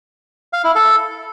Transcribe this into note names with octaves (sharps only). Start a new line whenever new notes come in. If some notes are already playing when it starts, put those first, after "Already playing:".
F5
E4
A4